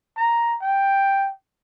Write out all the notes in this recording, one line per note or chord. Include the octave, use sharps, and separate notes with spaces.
A#5
G5